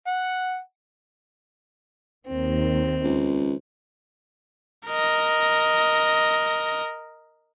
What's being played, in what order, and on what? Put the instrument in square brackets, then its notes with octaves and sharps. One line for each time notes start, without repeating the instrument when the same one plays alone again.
[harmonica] F#5
[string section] D#2 D#3 [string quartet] C4
[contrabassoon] C#2
[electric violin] A#4 D#5